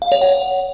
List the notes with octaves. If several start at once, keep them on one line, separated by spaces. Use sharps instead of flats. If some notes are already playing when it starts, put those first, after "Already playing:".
F5
C#5
F#5